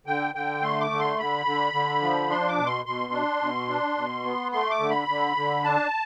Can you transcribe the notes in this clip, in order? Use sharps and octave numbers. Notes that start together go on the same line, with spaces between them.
D3 G5
D3 G5
A3 C6
D6
D3
C6
D3 B5
D3
D3
F3
D4 C6
D6
B2
C6
B2 C6
D4
B2
D4
B2
B3
A3 C6
D6
D3
B5
D3
D3
D4 A5